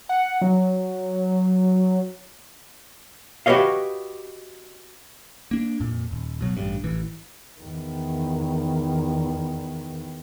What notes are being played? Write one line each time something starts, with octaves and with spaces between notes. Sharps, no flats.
F#5
F#3
F#4 G4 B4 C#5 D#5 F5
A#3 D4
F2 A#2
D#1
B2 F#3
A1 G2
A1 E3
E2 D#3